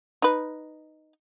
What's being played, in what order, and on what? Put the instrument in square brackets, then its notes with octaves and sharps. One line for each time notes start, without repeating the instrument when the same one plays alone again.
[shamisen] D#4 B4